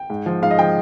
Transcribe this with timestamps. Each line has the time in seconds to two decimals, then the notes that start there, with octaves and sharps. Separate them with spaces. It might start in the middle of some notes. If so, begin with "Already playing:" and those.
Already playing: G5
0.10 G#2
0.26 F3
0.42 G#2 F5
0.51 D#5
0.59 F3 G5